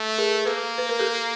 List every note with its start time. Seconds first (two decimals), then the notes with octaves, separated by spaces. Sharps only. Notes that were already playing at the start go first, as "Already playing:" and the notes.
Already playing: A3
0.18 G#4 A#4
0.45 A#3 A4 B4
0.78 B4
0.89 A#4
0.99 G4 A4